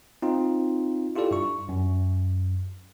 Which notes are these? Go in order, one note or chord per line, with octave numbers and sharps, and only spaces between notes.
C4 D#4 F4
E4 F4 G4 A4 D5
G2 C#6
F#2